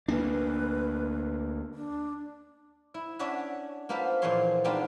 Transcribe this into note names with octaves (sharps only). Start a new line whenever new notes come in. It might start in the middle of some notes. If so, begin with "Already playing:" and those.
D2 A#3 D4 B4
D4
E4
C#4 D4 C#5 E5 F#5
A#3 B3 F4 A4 B4 C5
A#2 E3 F3 G#4 C#5 C6
G#3 B3 C4 D4 D#4 F4